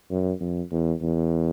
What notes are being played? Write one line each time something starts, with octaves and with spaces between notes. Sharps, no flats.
F#2
F2
E2
E2